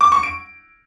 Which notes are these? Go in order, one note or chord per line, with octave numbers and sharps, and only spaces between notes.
D6
C#6
D7